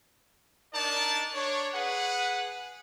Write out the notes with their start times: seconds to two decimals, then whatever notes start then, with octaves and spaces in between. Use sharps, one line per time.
0.74 D4 D#4 A#4 D5 A5
1.34 D4 C#5
1.74 G#4 B4 F#5